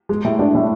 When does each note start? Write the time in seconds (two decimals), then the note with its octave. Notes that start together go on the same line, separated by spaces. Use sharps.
0.09 G#3
0.24 A2
0.39 D4
0.55 A2